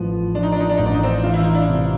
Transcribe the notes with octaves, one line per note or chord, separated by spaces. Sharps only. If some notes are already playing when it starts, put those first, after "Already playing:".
Already playing: A1 F3 B3
F3 D4
D#4
D4
D#4
D4
A1 D#4
D4
D#4
C4 D4
E3 F4
E4
D#4
D4 E4
C3